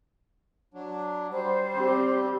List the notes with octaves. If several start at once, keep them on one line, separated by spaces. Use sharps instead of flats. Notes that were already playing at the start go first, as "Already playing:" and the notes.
F#3 D4
G3 C5
C4 G4